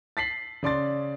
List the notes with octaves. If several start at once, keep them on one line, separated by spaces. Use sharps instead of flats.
A6 B6 C7 F#7
C#3 D5 C6 A6